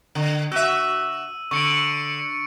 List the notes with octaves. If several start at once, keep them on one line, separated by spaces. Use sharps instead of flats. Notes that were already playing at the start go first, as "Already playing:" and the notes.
D3
F#4 E5 E6 D#7
D3 C#6 C#7 D7